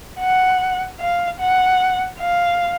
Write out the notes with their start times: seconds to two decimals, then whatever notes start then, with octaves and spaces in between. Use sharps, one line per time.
0.20 F#5
1.00 F5
1.40 F#5
2.20 F5